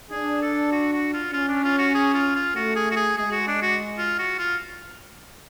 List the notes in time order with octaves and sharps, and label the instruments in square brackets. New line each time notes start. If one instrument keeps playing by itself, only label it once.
[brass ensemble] D4 [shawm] G#4
[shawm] A4
F#4
F#4
F4
[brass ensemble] C#4 [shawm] F4
[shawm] D4
F4
F#4
G#4
F4
F4
[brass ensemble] A3 [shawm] F#4
[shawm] G#4
F#4
G#4
[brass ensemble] G#3 [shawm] G#4
[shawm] F#4
D4
F#4
F4
F#4
F4